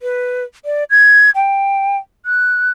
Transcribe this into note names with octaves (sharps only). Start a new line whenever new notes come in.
B4
D5
G#6
G5
F#6